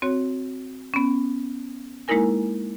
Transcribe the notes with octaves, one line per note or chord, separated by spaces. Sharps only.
C4 F#4 C#5
B3 C#4
G#3 A#3 D#4 E4 A#4 G#5